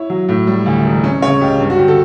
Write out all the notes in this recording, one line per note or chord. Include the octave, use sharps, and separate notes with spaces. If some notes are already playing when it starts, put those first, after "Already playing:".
Already playing: E4 C#5
F#3
A2
G3
D2
E1
C#4
C#3 C#5
C#2 G4
G2
F#4
D3 G4
A4